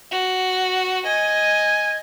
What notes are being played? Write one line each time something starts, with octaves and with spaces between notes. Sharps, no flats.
F#4
D#5 G#5